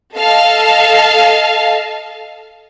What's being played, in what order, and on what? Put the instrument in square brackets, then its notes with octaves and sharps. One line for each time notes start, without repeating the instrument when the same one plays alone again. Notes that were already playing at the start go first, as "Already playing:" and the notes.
[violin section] A4 D#5 F5 A5